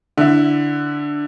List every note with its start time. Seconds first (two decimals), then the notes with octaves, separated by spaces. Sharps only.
0.18 D3 E4